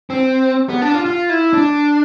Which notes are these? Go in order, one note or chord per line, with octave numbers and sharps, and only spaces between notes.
C4
B3
D4
F4
F4
E4
D4